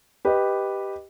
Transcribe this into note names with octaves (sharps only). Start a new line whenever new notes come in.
G4 B4 D#5